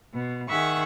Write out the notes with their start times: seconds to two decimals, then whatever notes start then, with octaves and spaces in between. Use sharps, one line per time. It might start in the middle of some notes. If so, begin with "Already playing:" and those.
0.13 B2
0.49 D#3 G#4 E5 F#5 C#6